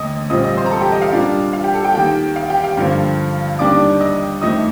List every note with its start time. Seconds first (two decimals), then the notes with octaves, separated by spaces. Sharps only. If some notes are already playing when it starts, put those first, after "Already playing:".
Already playing: D#2 D3 A3 D#5 D#6
0.30 A#1 A#2 G3 C4 F4 D#5 D#6
0.44 D#5 D#6
0.57 C5 C6
0.66 A#5
0.71 A4 A5
0.81 G4 G5
0.92 D#5
1.02 F5
1.12 A#2 G3 A#3 D4 F4
1.53 F5
1.64 G4 G5
1.74 A4 A5
1.84 G4 G5
1.95 D#2 D#3 A#3 G4 G5
2.36 F5
2.50 G4 G5
2.64 F5
2.77 G2 D3 F3 A#3 F4
3.59 D#2 D#3 G3 D4 D5 D6
4.00 D#5 D#6
4.41 F2 D#3 A3 D#5 D#6